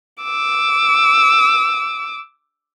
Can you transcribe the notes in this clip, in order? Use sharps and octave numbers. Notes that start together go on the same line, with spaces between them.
D6 E6